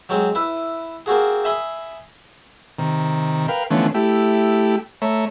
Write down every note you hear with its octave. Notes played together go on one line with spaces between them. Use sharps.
F#3 G#3 C4
E4 B4 E5
A#3 C4 F#4 G#4
E5 G#5 B5 C6 D#6
C3 D#3 A#5
A#4 B4 F5 G5
D3 E3 F3 A3 B3 C#4
A3 E4 G4
A3 C#5 E5 A#5